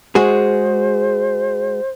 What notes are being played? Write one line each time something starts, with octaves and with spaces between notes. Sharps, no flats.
G#3 F#4 G#4 C5